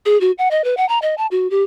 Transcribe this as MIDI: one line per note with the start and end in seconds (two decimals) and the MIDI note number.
0.06 0.20 68
0.21 0.32 66
0.38 0.49 78
0.51 0.64 75
0.64 0.75 71
0.77 0.87 78
0.89 0.99 82
1.02 1.15 75
1.18 1.27 81
1.31 1.50 66
1.51 1.63 67